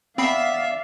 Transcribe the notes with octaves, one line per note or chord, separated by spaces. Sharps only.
B3 C4 D5 E5 F5 B5 C7